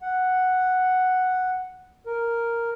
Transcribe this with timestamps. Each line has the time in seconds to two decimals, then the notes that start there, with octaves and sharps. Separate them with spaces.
0.02 F#5
2.06 A#4